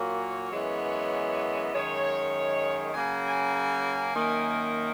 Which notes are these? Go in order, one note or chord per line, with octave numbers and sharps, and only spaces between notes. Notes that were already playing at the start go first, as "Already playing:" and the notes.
Already playing: A#2 F#3 A#3 C#5
F#2 E3 G#3 B3
F#2 D#3 G#3 C#5
C#3 F#3 A#3 G#5
G#5
G#5
F#2 D#3 A#3